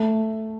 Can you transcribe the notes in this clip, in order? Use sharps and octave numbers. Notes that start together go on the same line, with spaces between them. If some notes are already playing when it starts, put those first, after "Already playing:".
Already playing: A3